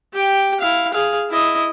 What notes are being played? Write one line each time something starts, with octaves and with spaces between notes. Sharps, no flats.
G4 G5
E4 F5
G#4 F5
E4 D#5